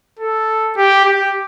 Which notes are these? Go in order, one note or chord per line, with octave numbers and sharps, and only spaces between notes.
A4
G4
G4